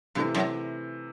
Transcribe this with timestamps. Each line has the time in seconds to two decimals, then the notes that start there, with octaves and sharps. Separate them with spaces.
0.15 G2 C3 E3 A3
0.35 F#2